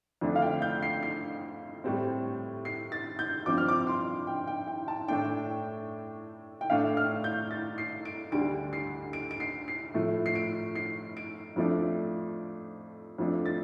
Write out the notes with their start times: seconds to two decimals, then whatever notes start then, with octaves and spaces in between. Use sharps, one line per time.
0.21 F2 D3 A3 D4
0.36 F5
0.42 G5
0.62 G6
0.82 C7
1.03 C7
1.84 A2 G3 C4
2.65 C7
2.92 A6
3.19 G6
3.46 G2 F3 C4 D6
3.58 F6
3.68 D6
3.87 C6
4.27 G5
4.47 G5
4.67 G5
4.88 A5
5.08 A2 A3 D4 G5
6.61 G5
6.70 A2 A3 D4 F5
6.97 F6
7.24 G6
7.51 A6
7.78 C7
8.05 D7
8.32 D2 D3 G3 D7
8.73 C7
9.13 D7
9.31 D7
9.40 C7
9.68 C7
9.94 A2 F3 A3
10.26 C7
10.35 D7
10.76 C7
11.17 D7
11.56 F2 F3 A3 D4
13.18 F2 F3 A3 D4
13.46 A6